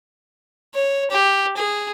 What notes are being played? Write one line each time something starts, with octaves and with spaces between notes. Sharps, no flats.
C#5
G4
G#4